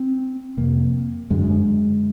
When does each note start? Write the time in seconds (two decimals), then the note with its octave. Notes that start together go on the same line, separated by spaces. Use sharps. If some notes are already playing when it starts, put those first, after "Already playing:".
Already playing: C4
0.57 F2 C3 A#3
1.30 F#2 D3 G#3